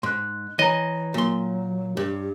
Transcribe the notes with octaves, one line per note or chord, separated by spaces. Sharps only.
G#2 C6 F#6
E3 C#5 D#5 A#5
A#2 F#3 C6
G2 G4